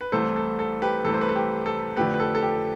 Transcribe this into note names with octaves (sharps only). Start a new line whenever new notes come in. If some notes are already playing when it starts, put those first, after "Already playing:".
B4
C2 C3 E3 A3 A4 C5
A4
A4
G4 B4
C2 C3 E3 A3 A4
C5
B4
A4
G4
A4
F2 D3 F3 A3 G4 B4
B4
A4
A4
G4